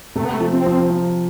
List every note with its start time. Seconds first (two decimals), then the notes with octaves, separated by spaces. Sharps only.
0.15 C3 A3
0.25 B3
0.33 A3
0.40 F3
0.53 C4
0.66 F3
0.90 F3